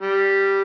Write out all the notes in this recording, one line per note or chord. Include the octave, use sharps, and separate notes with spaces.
G3